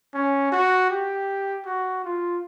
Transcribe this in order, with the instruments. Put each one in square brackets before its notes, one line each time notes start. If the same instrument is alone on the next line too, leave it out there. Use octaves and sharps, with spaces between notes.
[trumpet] C#4
F#4
G4
F#4
F4